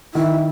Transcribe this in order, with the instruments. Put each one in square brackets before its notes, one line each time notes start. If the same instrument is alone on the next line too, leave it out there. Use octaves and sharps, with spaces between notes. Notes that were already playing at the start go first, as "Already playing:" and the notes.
[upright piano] D#3 [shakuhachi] E4